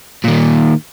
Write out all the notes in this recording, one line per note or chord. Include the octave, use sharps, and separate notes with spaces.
A#2 D#3